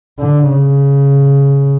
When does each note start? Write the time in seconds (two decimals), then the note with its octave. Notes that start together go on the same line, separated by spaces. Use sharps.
0.19 D3
0.49 C#3